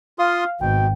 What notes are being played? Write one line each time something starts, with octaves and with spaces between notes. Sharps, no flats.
F4 F5 C6 D#6
G#1 B2 G5